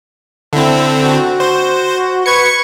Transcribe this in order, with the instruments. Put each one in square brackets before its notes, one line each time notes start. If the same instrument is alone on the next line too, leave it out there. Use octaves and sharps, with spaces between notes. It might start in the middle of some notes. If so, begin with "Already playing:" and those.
[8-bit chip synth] D3 C4 [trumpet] E4
[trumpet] F#4
[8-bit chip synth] C5
[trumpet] B4 [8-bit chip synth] C#6 G#6 C#7